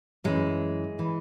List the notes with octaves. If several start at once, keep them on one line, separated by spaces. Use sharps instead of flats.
F#2 E3 G#3
E3